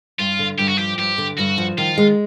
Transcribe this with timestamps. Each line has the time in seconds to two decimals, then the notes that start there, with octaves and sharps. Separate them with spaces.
0.19 G2 F4
0.39 D3
0.58 G2 G4
0.68 F#4
0.77 F3 G4
0.98 G2 G4
1.18 D3
1.37 G2 F#4
1.58 F3
1.78 D#3 F4
1.98 G#3